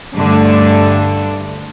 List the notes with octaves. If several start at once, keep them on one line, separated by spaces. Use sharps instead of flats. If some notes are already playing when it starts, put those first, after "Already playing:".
G2 D3 A3 D4